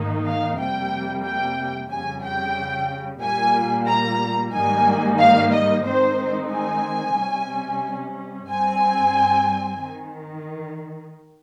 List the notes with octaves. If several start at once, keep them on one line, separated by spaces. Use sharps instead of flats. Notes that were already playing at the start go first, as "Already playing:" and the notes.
Already playing: G#2 D#3 A#3 D#4
F5
F2 C3 G3 A#3 G5
G5
F2 C#3 G3 G#5
G5
A#2 G3 A#3 G#5
A#5
G#2 D#3 G3 A#3 D#4 G#5
F5
D#5
D#3 G#3 C4 D#4 C5
G#5
C3 G3 C#4
G2 G3 C4 G#5
D#3